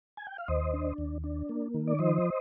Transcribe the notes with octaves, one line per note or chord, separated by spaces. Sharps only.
G#5
G5
F5
D#2 C5 D#5
D4
D#2
D4
A#3
D#3
D5
F3 C5 D#5